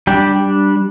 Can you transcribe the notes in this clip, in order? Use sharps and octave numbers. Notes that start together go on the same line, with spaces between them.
G3 D4 G4